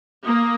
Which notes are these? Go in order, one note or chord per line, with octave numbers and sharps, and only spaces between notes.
A#3 D#6